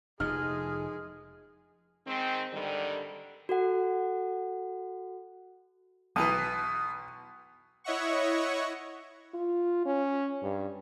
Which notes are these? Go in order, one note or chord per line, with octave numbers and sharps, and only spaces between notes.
F1 F3 G#3 D#4 G#4 F6
D#3 G#3 C4
G#2 D3 D#3 G3
F#4 A4 F#5
B1 B2 E3 D#6
E4 C#5 D#5 E5 F#5 C#6
F4
C#4
G2